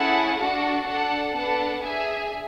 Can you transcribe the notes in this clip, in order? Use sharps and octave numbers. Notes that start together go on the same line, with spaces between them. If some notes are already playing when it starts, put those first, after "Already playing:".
Already playing: A3 C#4 E4 G#4 F#5 A5
D4 F#4 A4 F#5 A5
D4 A4 F#5 A5
B3 D4 A4 F#5 A5
D4 G#4 E5 G#5